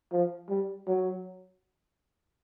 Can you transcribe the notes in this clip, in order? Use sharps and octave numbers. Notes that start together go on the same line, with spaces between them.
F3
G3
F#3